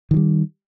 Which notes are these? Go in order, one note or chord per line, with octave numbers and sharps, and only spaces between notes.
D#3 E3 G3